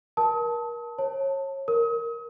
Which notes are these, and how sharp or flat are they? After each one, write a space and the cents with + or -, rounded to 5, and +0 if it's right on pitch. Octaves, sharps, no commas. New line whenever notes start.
A#4 +30 A5 +0 D#6 +40
C#5 -30 A5 +20
A#4 +0 D#6 +40